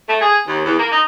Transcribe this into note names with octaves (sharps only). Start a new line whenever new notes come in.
A3
G#4
D#2
E2
A#3
D#4